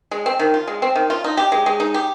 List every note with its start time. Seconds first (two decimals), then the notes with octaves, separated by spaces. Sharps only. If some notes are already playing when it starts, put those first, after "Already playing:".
0.11 G#3
0.26 C4
0.39 D#3
0.54 F4
0.67 G#3
0.82 C4
0.95 D#3
1.10 F4
1.24 D#4
1.37 G4
1.52 G#3
1.66 G#3
1.80 D#4
1.94 G4